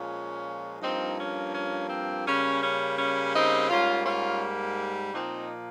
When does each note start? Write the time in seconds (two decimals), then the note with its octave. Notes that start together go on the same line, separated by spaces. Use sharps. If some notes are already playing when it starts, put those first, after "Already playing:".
Already playing: A#2 F3 G#3 C#4
0.82 G2 F3 A#3 C4 D#4
1.18 C#4
1.54 C#4
1.90 C4
2.27 C#3 G3 A#3 C#4
2.63 C#4
2.99 C#4
3.35 C4 D#4
3.70 G#2 G3 A#3 C#4 F4
4.06 C#4 F4
5.13 A#2 F3 A#3 C4 D#4